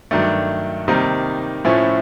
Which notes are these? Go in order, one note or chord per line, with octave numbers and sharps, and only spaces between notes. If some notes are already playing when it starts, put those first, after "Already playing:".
G2 D#3 F#3 A3 D4
C3 D#3 G3 A#3 D#4
A2 F3 A3 C#4 E4